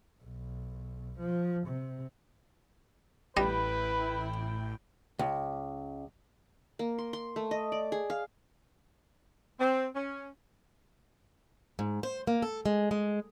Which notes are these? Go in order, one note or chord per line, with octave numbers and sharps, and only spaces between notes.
B1
F3
C3
A1 A2 G3 E4 B4 D#5 G5
C#2
A#3
C6
C6
A3
D#5
D5
G#4
F5
C4
C#4
G#2
C5
A#3
A4
G#3
G#3